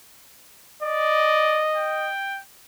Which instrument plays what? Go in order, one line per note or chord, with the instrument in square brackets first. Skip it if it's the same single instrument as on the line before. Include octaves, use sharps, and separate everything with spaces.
[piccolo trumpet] D5 [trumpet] D#5
[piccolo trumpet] G5